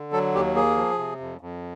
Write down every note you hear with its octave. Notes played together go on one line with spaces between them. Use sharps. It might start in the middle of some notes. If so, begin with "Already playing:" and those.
Already playing: D3
F#3 A4
D#2 G4
A#3 G#4
F3
C3
F2
F2